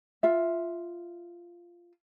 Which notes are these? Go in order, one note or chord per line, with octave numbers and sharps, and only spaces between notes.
F4 E5